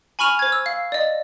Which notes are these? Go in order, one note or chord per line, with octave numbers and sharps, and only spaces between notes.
G#5 B5 C#6 F6 D#7 F7
C5 G#6
E6
F5
D5 D#5